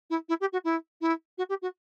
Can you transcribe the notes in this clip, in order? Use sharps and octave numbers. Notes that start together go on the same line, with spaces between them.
E4
E4
G4
F#4
E4
E4
F#4
G4
F#4